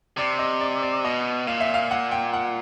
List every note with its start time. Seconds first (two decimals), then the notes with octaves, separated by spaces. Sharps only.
0.17 C3 D5
0.39 D#5
0.61 D5
0.82 D5
1.04 B2 D#5
1.47 A#2 F5
1.60 E5
1.74 F5
1.91 F#5
2.11 G5
2.34 F#5